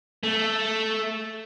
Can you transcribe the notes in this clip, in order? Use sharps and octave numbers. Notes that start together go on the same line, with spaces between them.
A3